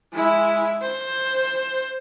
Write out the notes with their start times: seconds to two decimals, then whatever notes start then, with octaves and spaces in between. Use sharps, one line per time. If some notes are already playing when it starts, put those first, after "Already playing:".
0.12 G#3 E4
0.82 C5